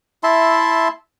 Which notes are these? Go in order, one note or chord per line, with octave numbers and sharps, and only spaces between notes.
E4 E5 A5 C6